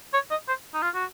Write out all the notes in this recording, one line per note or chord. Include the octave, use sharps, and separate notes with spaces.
C#5
D#5
C5
D#4
F4
F#4